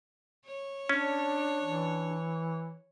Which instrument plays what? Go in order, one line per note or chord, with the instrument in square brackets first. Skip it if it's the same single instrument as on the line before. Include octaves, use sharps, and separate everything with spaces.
[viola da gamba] C#5
[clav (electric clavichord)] C#4 [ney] D4
[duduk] E3